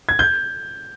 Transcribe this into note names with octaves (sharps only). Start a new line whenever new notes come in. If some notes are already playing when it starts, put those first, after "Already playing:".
G#6
G6